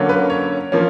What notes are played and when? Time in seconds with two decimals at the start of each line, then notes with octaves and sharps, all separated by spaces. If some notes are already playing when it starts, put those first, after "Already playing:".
Already playing: D3 F#3 A#3 C#4
0.09 B4
0.30 C#5
0.72 F3 A#3 C#4